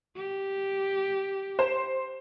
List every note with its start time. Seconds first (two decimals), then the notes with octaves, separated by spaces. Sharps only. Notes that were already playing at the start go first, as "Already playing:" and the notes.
0.16 G4
1.59 C5